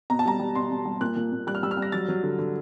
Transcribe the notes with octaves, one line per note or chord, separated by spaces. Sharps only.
B2 A#5
A5
G3 A#5
G3
B2 C6
B2
G3
A#2 F#6
A#2
A#2
G3 F#6
F6
G3 E6
F6
G3
A#6
F#3 A6
F#3
D3
D3